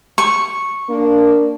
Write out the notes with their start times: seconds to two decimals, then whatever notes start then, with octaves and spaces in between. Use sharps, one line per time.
0.18 C#6
0.89 A#3 D4